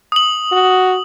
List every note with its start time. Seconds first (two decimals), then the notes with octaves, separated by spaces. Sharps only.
0.12 D#6 F#7
0.52 F#4